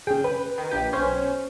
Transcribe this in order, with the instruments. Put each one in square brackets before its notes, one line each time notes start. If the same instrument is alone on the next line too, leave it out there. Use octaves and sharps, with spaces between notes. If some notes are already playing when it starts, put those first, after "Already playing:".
[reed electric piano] C#4 G#4 [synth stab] G5
[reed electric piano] B4
[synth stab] D#3
A#1 G4 D#7
B1 C#4 C5